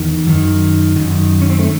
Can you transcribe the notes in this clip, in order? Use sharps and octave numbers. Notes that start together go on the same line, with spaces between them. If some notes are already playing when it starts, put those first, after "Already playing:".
Already playing: E2 D#3
F#2 D#3
F#2 D#3
C#4
C4
A3